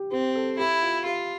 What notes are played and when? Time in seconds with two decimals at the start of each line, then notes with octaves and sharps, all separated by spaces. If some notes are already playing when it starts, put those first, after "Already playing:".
Already playing: G4
0.12 C4 G4
0.35 A4
0.59 E4 G4
0.83 F4
1.05 F4 G4